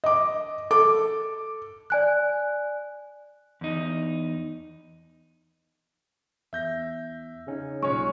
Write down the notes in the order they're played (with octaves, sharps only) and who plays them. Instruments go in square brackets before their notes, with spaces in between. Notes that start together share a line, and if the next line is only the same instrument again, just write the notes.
[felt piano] D#5 D6
A4 D6
[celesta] D5 G#5 F#6
[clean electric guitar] E2 D#4
[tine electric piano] E2 [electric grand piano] E5 G6 A#6
[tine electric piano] C#3 C#4 D#4
[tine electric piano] B1 A#2 [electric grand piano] G#3 C#4 C#5 [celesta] C#6